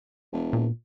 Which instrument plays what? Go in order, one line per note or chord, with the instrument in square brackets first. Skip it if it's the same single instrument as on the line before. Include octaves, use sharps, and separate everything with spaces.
[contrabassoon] E1
[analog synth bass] A#2